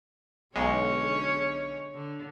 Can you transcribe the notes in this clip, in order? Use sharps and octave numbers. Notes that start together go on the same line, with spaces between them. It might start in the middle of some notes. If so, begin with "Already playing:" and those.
B1 D3 G#3 C#4 C#5
D3